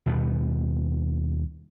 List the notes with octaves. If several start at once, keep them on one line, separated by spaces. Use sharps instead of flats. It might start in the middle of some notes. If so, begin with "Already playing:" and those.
D#2 B2 G3 B3